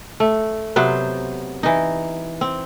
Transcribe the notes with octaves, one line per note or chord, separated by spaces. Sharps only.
A3
C3 F#3 B3 C5
E3 D#4
C4